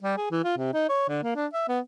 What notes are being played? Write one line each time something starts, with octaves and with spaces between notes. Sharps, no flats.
G3
G#4
E3
F4
C3
D#4
C#5
D3
A#3
D4
E5
B3